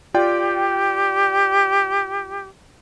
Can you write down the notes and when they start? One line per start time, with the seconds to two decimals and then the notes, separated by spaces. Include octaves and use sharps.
0.14 F4 G4 D5 G5